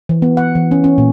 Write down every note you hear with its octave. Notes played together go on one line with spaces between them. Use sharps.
E3
B3
F#5
E3
C#4
C#4
A#2